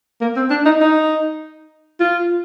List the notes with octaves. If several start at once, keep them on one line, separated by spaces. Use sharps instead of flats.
A#3
C4
D4
D#4
D#4
F4